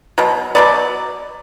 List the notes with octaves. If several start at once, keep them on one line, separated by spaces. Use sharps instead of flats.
B2 F#3
B2 F#3 B3 D5